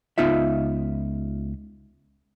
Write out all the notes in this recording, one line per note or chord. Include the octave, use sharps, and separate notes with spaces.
C#2 B3 D#4 F4 E5